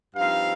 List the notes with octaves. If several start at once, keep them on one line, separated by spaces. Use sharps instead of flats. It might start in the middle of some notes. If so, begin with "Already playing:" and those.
G2 F3 C4 D#4 F5